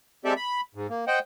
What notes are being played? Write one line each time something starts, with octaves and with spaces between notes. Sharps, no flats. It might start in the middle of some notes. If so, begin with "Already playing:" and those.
G#3 C4 G4 A4 D5 E5
B5
G#2
A#3
C5 D#5 F#5 G5